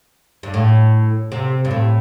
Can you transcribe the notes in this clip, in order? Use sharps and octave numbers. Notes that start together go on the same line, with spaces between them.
G2
A2
C3
G2
A2